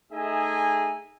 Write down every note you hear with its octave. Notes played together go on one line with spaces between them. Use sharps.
A3 D#4 G#4 D#5 E5 G#5